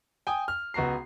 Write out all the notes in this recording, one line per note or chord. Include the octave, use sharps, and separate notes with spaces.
G5 G#5 D#6
F6
C#2 B3 F#4 A#5 C7